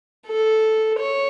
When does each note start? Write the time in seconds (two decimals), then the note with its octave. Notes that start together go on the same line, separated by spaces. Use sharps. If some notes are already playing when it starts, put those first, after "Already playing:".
0.27 A4
0.99 C#5